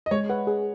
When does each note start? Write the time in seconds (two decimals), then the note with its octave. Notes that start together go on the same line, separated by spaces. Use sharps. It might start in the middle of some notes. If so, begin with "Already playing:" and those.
0.06 D#5
0.11 G#3 C#5
0.29 B4 F#5
0.47 G#4